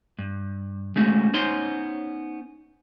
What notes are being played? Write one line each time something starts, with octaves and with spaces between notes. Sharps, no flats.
G2
G#3 A3 C#4 F#4
B3 C#4 D#4 C5 C#5 C6